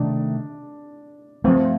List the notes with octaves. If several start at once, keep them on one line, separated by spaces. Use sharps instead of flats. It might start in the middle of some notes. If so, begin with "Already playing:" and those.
Already playing: C3 D#3 A3 D4
G2 F3 A3 C4